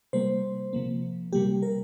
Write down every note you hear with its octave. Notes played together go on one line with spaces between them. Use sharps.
C3 G3 A#3 C5
C3 F3 A#3
C3 G3 A#3 G4
A#4